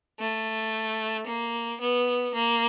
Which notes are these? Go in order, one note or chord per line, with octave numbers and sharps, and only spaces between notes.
A3
A#3
B3
A#3